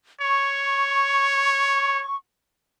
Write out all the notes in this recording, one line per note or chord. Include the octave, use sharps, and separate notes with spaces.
C#5 C#6